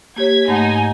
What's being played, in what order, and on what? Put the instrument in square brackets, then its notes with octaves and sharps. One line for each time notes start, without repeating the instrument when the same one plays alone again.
[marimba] A#3 G4 C#5 [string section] G#6 B6
[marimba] G#2 A3 F#5 [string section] D#4 G#5